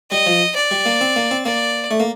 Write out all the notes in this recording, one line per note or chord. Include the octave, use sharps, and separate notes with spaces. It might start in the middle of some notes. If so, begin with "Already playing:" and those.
G3 D#5
F3
D5
G3
A#3
C4
A#3
C4
A#3 D5
A3
A#3